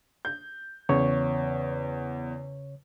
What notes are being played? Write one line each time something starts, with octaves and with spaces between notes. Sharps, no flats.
G6
E2 C#3 C#5